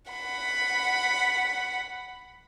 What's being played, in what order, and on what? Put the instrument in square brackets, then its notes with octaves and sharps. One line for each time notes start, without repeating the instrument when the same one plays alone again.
[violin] F#5 B5